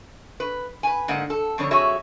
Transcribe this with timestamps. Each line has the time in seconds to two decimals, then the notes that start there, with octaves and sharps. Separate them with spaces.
0.40 B4
0.83 B4 G#5
1.08 G#2 D3 A#3 F#5
1.30 A4
1.58 F2 D3 G3 C#5
1.71 F2 F#4 G#4 C#5 E5